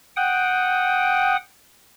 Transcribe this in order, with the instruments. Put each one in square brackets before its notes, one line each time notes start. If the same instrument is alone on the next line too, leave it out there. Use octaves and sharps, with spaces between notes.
[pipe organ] F#5 G5 D#6